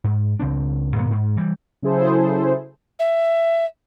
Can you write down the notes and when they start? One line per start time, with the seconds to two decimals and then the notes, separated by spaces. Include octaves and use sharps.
0.04 G#2
0.40 C#2 C#3 C4 D4
0.96 G2 A#2 D3 B3
1.11 G#2
1.37 E3 G3
1.82 C#3 F#3 E4 G#4 A4 C5
2.99 E5